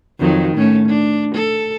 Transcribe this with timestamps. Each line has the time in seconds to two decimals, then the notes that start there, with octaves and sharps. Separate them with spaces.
0.20 F2 D#3 F#3
0.57 A2 A3 C#4
0.87 D4
1.35 A4